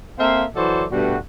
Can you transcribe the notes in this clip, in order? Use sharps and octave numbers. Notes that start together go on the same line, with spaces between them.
A#3 C4 A4 E5 F5
E3 F#3 F#4 A4 C5 D5
G2 B2 G3 A3 F#4